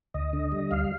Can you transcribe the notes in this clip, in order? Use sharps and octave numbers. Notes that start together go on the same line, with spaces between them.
D2 D#5
D3
G3
D2 F5